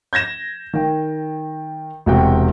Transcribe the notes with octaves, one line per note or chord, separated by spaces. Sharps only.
G6 G#6 A#6 E7
D#3 G5
E1 C3 F#4 G5